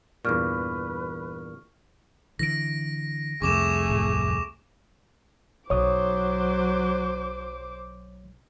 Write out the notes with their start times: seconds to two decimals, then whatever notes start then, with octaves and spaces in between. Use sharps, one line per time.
0.25 E2 G2 A#2 B4 C#6 F6
2.39 D3 E3 A#6 D7
3.42 C2 F2 C3 A3 G#4 C#6 D6 E7
3.88 D1 A2
5.70 B1 F#3 C5 C#5 D6 D#6